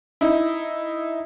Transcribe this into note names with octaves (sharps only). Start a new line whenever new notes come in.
D#4 E4